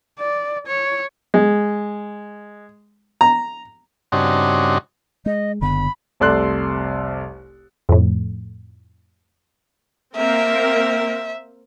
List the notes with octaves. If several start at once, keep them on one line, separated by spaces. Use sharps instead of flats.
D5
C#5
G#3
A#5
G2 C#3 C4 D4 D#4 F#4
G#3 D#5
F#1 D3 B3 B5
F1 C2 A4 D5 C6 F#6
F2 A2
A#3 C4 A#4 E5